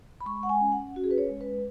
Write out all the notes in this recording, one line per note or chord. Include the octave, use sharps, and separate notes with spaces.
B5
G#3 C#6
F#5
G#5
C#4
F#5
C#4 F#4
G#4
B4
C#5
G#3
B4